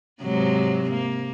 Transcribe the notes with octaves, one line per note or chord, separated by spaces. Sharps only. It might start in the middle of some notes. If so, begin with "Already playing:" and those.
G#2 C3 F#3
A#3